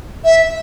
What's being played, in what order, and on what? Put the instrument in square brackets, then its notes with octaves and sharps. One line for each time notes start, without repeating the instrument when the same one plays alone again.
[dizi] E5